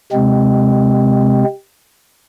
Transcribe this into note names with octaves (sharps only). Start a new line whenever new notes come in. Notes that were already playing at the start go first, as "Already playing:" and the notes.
C3 G#3 C4